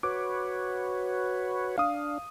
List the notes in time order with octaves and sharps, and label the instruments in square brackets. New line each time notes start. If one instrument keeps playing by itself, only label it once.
[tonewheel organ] F#4 B4 C#5 [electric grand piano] D6
[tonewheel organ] D4 [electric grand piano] F5 D#6